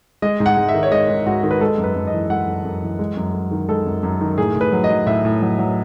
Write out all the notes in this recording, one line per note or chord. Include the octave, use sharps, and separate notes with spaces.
G#3 D#5
G#2
F#5
G#2
E5
D#3
C#5
G#3 D#5
G#2
G#2 F#4
D#3
B4
G#3 A4
F#2
B4
F#2
D#5
E3
G#3 F#5
F#2
F#2
E3
G#3
F#2
F#2
D#3
G#3 A4
F#2
F#2
D#3
A2 G#4
A2
B4
F#3
D#5
F#3
A2 E5
A2
F#3
F#3